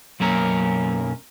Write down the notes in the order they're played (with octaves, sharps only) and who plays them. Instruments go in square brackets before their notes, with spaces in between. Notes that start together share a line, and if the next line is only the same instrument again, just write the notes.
[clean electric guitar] B1 F#2 A#3 C#4 A#4